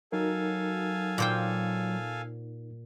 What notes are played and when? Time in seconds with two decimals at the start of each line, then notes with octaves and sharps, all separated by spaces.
0.12 F#3 D#4 A4 A#4 F5 G#5
1.18 A#2 C5 G5